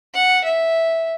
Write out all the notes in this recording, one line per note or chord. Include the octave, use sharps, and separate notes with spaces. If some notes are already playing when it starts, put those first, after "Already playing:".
F#5
E5